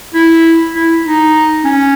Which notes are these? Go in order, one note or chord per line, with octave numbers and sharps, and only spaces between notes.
E4
E4
D#4
C#4